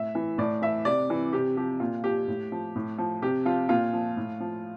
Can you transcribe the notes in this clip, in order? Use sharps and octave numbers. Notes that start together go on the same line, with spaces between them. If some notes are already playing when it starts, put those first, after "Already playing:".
Already playing: A2 E5
E3
A2 D5
E3 E5
C3 D5
E3
C3 G4
F3 G4
A#2 F4
F3 G4
A2
F3
A2
F3
C3 G4
F3 F4
A#2 F4
F3
A2
F3